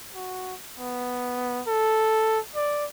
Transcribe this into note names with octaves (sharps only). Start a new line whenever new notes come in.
F#4
B3
A4
D5